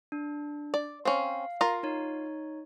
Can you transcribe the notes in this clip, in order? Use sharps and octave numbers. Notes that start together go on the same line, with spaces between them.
D4
D5
C4 C#4 F5
F4 A#4 A#5
D#4 C#5